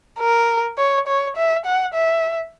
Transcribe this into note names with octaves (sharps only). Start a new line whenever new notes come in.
A#4
C#5
C#5
E5
F#5
E5